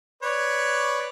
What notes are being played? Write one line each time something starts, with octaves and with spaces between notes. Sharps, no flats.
B4 C#5 D5